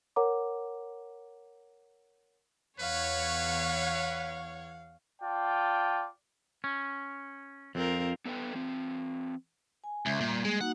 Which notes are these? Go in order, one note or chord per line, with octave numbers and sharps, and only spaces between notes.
A#4 C#5 F#5 A#5 D6
E2 B4 C#5 F5 F#5
F4 D5 G5 A5
C#4
F2 C4 F4 A#4
B3 A4 B4 E5 G5
E3 C4
G#5
C#2 E5
A#2 G3 A#3
G#3
A#3 D#4 F#4 F#5